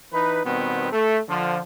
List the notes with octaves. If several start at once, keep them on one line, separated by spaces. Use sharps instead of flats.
E3 D#4 B4
B2 D#3 G3 B3 C4
A3
D3 F3